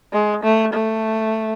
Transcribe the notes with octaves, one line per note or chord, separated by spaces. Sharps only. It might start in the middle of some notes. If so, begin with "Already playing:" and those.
G#3
A3
A3